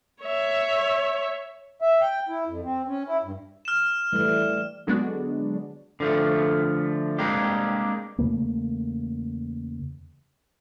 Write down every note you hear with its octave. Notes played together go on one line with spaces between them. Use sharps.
C#5 E5
E5
G5
E4
F2
C4
C#4
E4
G2
F6 E7
E3 G3 A3
D3 F#3 G#3 B3 D4 F#4
D3 F3 A3
G3 G#3 A#3 C4 D4 G4
E2 C#3 A3 A#3